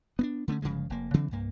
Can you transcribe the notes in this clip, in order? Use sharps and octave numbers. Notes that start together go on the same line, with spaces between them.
B3 C4 D4
D3 A3 B3 C#4
G1 C#3 F3 G#3
F1 A#3
C#3 E3 F#3 C4
C2 G2 A#3